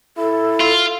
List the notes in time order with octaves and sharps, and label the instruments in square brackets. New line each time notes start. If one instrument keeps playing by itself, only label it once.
[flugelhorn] E4 [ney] A4
[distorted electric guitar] F4